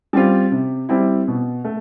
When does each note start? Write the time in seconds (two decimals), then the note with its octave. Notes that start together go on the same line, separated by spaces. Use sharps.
0.13 G3 C4 F4
0.52 C3
0.89 G3 C4 E4
1.28 B2
1.65 A3